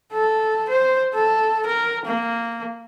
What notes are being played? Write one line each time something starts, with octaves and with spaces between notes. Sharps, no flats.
A4
C5
A4
A#4
A#3